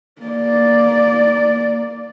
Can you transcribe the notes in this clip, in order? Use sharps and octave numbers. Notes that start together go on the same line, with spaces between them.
A#3 D5